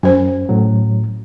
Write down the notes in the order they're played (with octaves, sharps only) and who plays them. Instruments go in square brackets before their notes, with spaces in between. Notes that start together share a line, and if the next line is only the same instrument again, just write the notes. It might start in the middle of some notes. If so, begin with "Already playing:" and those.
[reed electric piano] F#2 [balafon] C#4 C5
[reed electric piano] A2 F#3